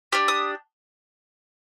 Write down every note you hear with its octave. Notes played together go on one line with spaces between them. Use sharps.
D4 G4 F6
D#6